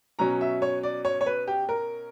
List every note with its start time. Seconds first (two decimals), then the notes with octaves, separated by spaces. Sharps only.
0.19 B2 F#3 C#4 A#5
0.41 E5
0.62 C#5
0.83 D5
1.05 C#5
1.21 C#5
1.26 B4
1.47 G4
1.69 A#4